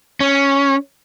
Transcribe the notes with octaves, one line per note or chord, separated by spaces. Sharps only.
C#4